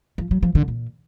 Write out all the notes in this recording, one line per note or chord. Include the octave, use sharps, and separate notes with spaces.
F3
F#3
F3
D3
A#2